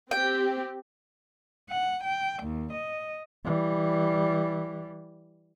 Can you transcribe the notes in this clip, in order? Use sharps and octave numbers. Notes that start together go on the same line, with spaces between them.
C4 G4 G5
F#5
G5
D#2
D#5
E3 G3